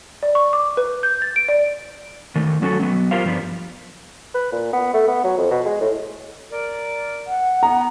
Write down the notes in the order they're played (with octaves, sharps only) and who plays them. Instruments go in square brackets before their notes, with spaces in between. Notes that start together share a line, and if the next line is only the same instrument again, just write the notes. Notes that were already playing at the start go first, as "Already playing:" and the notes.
[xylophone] D5
C#6
D6
B4
G6
A6
D7
D5
[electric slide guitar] D#3 A3
F#3 C#4 F#4 A4
F#3 B3
F4 G4 A#4 C5 F5
G2 F3 B3 D4
[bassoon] B4
A#2
B3
A3
B3
F#3
F2
B2
G#3
A2
[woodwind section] A#4 D5
[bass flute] F#5
[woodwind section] B3 [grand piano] A#5